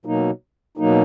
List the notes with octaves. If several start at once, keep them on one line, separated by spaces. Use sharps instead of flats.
B2 F#3 A#3 D#4
B2 F#3 A#3 D#4